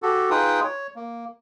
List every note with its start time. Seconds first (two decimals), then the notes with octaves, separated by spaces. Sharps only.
0.02 F#4 G4 A4
0.30 D#4 F4 G#4 B4 G5 D#6
0.64 C#5
0.96 A#3